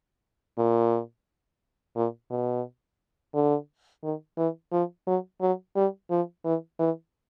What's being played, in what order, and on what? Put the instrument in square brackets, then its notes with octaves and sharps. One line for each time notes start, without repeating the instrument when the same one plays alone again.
[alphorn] A#2
A#2
B2
D3
D#3
E3
F3
F#3
F#3
G3
F3
E3
E3